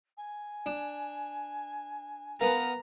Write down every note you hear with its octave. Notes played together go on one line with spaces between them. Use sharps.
G#5
D4
B3 A#4 B4 F5 A#5